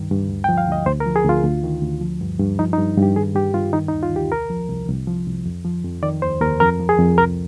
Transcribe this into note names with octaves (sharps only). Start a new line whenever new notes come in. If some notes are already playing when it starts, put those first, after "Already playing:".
Already playing: C2 G2 D#3
G2
D2
G5
F3
F5
D2 D#5
D2 C5
A#4
F3
G#4
D2 F4
D2
D#3
D2
F3
G2
G2
F3 D#4
D#4
G2
G2
G4
D#3 G#4
G2 G4
G2 F4
D#3 D#4
D#4
D#2
F4
D#2 G4
C2 A#4
F3
C2
C2
F3
C2
F2
F3
F2
D#3 D5
D#2 C5
D#2 A#4
F2 A#4
F3
G#4
F2
C2 A#4